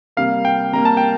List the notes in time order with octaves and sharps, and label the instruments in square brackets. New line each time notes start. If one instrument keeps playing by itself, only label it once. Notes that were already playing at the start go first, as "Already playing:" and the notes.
[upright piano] C3 G3 A#3 [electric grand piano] F5
[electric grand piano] G5
[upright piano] C3 G3 A#3 [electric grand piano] A#5
[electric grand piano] A5
G5